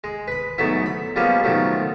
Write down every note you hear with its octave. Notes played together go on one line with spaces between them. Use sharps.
G#3
B4 B5
G#2 F#3 A3 B3 E4
B5
F3 G3 G#3 A#3 B3 C#4
B2 D#3 F3 F#3 A3